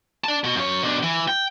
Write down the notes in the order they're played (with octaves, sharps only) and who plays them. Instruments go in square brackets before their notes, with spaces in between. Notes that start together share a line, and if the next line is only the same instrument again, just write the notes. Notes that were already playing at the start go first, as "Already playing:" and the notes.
[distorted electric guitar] D5 A5
B2
F#2 C#5
B2 D4
E3
G5